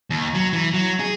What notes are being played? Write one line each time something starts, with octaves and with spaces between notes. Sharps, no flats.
D#2
F#3
E3
F#3
G#4